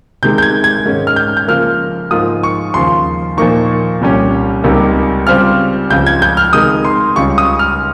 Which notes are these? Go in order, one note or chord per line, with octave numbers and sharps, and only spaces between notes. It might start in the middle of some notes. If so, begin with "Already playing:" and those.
C3 D#3 G#3 G6
G6
G#6
G#6
G#2 D#3 G#3 C#4
F6
G6
G6
C#3 F3 A#3 F6
G#2 F3 A#3 F4 D#6
C#6
D#2 C#3 F3 C6
A#2 F3 A#3 D#4 C#6
C2 A#2 G3 C#4
C#2 C3 G3 A#3 D#4
C#3 G3 C4 F4 F6
C#2 C#3 F3 G6
G#6
G6
F6
C3 D#3 G#3 D#4 D#6
C6
C#2 C#3 G3 C#4 F4 C#6
D#6
F6